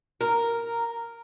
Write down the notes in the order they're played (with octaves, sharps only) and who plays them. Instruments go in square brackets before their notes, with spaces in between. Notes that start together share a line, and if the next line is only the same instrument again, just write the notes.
[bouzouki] A#4